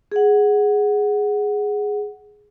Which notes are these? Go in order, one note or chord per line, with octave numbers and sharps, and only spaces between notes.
G#4 F#5